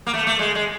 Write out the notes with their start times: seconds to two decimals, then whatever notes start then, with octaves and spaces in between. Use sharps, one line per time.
0.07 A#3
0.14 A3
0.27 A3
0.39 G#3
0.55 G#3